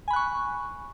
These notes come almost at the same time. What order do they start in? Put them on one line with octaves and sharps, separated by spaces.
G#5 B5 F#6 C#6